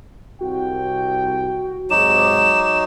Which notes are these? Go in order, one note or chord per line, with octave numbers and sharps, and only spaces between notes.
C2 F#4 G5
G#2 C3 F#3 D#4 D6 E7